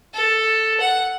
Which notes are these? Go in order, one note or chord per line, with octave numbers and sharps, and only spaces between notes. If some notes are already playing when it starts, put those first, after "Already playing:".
A4
F#5